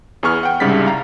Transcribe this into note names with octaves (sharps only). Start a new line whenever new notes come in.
E2 B3 G#4 C#6 F6
F#5 G5
C2 G#2 C#3 G3 A6 B6
F5 A#5